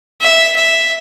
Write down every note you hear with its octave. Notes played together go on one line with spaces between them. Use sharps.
E5
E5